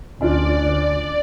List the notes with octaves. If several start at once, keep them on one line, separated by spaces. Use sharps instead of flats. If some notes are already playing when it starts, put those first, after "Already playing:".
D2 C#4 D4 F4 D5